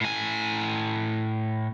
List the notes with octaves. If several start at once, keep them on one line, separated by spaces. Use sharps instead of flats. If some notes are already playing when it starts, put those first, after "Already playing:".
A2 G#5